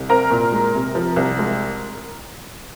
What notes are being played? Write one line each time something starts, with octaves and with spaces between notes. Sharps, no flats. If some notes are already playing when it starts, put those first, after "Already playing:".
Already playing: C2
C4 A#4 A#5
A#2
G#3
C3
F3
C2
G#3